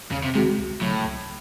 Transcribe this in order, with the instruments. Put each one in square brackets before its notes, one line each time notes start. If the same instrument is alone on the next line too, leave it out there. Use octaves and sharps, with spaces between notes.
[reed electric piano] E2 [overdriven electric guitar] C#3
[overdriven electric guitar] C3
[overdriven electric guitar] C3 [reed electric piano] D#3 G#3 C4 F#4
[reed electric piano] C#2
[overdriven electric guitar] A2 [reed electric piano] C#3 F#3
[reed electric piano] C#2